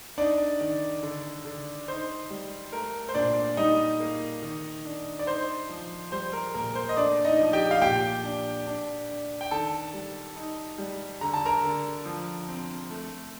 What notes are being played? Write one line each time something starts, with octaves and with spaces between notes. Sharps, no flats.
D4 D#4 D5
D#3
D3
D3
D#4 C5
G3
A3 A#4
C5
A#2 D4 D5
G3 D#4 D#5
A#3
D#3
D4
D5
D#4 C5
F3
G3 C5
A#4
A#2 A#4
C5
D#5
A3 D4 D5
D#4 D#5
F3
G4 G5
F5
A#2 G4 G5
D4
D4
D4
G5
D#3 A4 A5
G3
D#4
G3
D3 A#5
A5
A#4 A#5
D3
F3
C4
A3